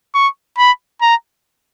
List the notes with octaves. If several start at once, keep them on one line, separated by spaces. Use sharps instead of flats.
C#6
B5
A#5